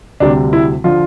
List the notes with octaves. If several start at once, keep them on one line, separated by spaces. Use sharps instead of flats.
D2 C3 G3 D4
E4
D3 F3 F4